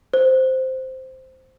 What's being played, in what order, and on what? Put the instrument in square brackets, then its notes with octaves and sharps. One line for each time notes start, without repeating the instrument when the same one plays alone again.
[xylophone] C5